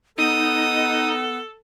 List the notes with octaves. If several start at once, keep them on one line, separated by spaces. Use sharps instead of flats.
B3 D#4 A4 D#6